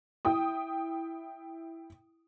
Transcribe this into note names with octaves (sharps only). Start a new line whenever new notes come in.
E4 G5 D#6